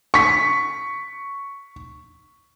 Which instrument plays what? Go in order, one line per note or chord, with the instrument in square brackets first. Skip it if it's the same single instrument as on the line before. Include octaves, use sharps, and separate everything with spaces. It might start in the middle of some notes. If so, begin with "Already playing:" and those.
[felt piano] C#6 B6